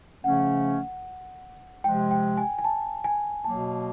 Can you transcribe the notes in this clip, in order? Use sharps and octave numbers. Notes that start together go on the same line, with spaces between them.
C#3 F3 A3 C#4 F#5
C3 F3 G#3 G5
G5
G#5
G#5
A5
G#5
B2 F#3 A#3 A5